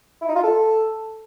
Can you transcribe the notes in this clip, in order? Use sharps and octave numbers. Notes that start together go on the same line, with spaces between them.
E4
D#4
F4
A4